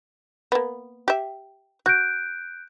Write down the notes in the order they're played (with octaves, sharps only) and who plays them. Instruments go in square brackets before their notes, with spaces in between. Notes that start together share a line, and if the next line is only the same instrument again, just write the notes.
[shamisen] A#3 B3
G4 E5
[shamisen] F#4 [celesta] F#6 G6 D7